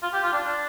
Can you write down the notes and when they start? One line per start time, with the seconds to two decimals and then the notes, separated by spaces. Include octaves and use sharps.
0.03 F4
0.13 G4
0.23 F4
0.33 D4
0.43 D4